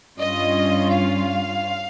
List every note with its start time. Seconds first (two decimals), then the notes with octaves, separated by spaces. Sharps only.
0.18 G2 G3 C#4 F4 D#5
0.91 F5